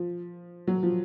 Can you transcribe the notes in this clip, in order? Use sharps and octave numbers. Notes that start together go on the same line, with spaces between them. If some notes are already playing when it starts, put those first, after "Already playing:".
Already playing: F3
F#3
F3